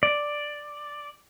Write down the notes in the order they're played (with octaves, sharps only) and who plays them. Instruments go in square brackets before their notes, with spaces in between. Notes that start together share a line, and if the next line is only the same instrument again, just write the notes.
[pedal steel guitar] D5